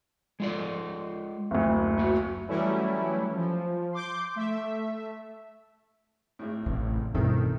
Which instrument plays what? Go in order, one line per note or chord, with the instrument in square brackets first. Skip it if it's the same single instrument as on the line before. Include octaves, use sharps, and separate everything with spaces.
[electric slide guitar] G#3 F4 D5
[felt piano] F#1 D2
[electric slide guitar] A#3 F#4
[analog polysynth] E3 F#3 G3 A3 C#4 E4
F3
C6 D6 G6
A3 E5
[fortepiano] G#1 A2
[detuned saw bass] A1 [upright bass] C3
[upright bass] D2 B2 [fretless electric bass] G2 [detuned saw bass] D#3 [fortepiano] C4 E4 A4